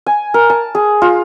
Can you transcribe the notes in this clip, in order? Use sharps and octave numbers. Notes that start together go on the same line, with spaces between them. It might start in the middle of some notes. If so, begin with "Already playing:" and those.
G#5
A#4
A5
G#4
F4